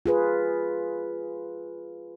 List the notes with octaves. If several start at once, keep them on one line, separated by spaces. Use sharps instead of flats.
F4 G#4 B4